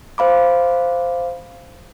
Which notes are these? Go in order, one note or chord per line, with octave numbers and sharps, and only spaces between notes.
C5 F5 B5 D6